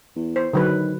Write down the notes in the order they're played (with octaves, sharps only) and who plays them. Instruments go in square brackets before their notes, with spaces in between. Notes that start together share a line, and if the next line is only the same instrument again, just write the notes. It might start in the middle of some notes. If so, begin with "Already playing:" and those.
[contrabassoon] E2
[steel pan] C5
[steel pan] D3 F#3 B4 [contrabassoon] D#3